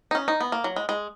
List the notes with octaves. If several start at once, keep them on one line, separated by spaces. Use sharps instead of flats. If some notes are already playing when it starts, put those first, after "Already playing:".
D#4
C#4
D#4
B3
A#3
F#3
G#3
G#3